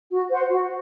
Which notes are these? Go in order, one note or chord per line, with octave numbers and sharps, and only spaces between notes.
F#4
C5 F#5 C6
F#4